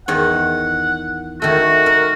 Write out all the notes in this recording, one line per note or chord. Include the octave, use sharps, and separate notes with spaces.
E2 D#3 C#5 F#5
D#3 A3 F#4
A#4